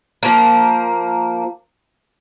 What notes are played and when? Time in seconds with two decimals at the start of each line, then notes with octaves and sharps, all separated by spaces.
0.23 F3 A#3